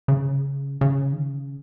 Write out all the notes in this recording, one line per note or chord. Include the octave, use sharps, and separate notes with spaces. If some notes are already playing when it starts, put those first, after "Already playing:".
C#3
C#3
D#3
C#3